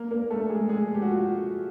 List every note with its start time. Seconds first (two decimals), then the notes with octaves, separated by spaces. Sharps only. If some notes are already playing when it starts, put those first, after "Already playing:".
Already playing: A#3 A#4
0.11 A#3 A#4
0.30 A3 A4
0.50 G#3 G#4
0.69 G#3 G#4
0.95 G4
1.02 F#4
1.09 F4